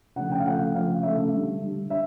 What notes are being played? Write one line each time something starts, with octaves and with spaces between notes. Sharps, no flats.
C#3 F3 A3 F#5
G5
F5
C#3 F3 A3 F#5
C#3 F3 A3 F5
C#3 F3 A3 E5
D3 G3
D3 G3
E5